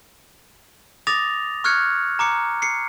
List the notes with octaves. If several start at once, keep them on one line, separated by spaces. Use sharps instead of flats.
D6 D#6 A6 A#6 F7
C#6 F6 F#6 G#6 C#7
A#5 D6 C#7
C7 C#7